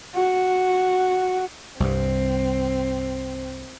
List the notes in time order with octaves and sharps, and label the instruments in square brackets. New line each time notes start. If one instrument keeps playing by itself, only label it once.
[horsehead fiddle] F#4
[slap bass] C2 G2 [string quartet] C4